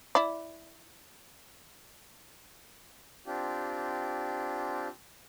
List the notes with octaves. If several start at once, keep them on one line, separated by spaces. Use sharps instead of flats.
E4 D5
C4 D4 F4 G4